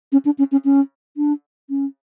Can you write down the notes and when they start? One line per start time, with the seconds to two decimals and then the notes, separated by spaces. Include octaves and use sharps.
0.12 C#4
0.25 D4
0.39 C#4
0.52 C#4
0.65 C#4
1.17 D4
1.70 C#4